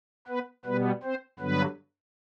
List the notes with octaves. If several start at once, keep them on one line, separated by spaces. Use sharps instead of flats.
B3 B4
B2 G3 B3 B4
C4 C5
G2 D3 F#3 B3 B4